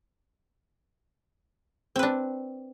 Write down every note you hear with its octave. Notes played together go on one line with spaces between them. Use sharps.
C4 D4 B4